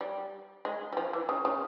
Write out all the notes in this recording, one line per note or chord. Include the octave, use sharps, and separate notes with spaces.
G3
G#3
G3
F3
E3
C#3
C#3